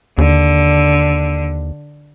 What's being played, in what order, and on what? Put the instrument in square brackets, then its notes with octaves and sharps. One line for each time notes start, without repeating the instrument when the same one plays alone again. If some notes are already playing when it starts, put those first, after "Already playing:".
[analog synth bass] D#2 [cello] D3